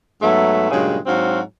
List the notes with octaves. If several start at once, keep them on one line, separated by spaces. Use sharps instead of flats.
G#2 F#3 A3 B3 E5
G2 A#2 C#3 F#3 G#3
G#2 F#3 C4 D4 F#4 F5